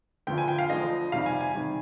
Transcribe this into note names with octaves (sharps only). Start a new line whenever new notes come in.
D2 D3 F3 G5
G#5
G5
F5
D2 D3 F3 D#5
F2 C3 D#3 G3 F5
G#5
G#5
C3 D#3 G3